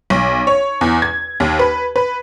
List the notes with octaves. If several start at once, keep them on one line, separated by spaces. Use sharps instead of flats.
B1
C#5
E2
G#6
D#2
B4
B4